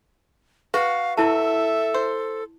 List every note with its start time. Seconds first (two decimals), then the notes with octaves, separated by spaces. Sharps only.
0.74 F#4 B4 F5
1.17 E4 A4 E5 A5
1.94 C5